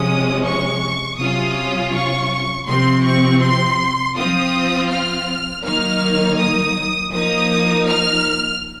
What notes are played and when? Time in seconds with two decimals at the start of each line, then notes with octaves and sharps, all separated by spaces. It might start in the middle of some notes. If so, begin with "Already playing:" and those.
Already playing: C3 F3 G#3 C#4 D#6
0.44 C#6
1.18 C3 F#3 C#4 F4 D#6
1.93 C#6
2.66 C3 F3 C4 C6
3.04 C#6
3.41 C6
4.16 F3 C4 F4 D#6
4.90 F6
5.64 D#3 F#3 A#3 D#4 F6
6.38 D#6
7.12 F3 A#3 D#4 D#6
7.87 F6